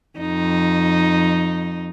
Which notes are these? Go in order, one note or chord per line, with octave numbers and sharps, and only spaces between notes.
F2 D#4